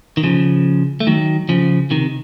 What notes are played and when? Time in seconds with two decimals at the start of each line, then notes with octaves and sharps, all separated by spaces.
0.17 D#3
0.23 C#3 F3
1.00 A3
1.07 D#3 F#3
1.49 C#3 F3
1.91 C3 D#3